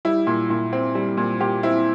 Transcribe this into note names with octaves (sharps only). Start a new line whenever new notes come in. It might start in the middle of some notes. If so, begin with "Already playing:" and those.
G3 E4
A#2
A#2
C4
G3
A#2
A#2 G4
C4 E4